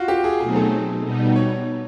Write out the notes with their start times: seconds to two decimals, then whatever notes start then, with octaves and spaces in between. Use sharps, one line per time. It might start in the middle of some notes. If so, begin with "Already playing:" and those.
Already playing: F4 F#4
0.08 G4
0.24 G#4
0.40 B2 F#3 A3 C4 D#4 G#4
0.56 A4
1.04 B2 G3 B3 D#4
1.36 C#5